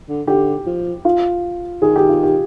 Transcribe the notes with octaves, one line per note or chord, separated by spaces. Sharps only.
D3
D3 G4
F3
F4
D#3 G#4
G4
F4
G4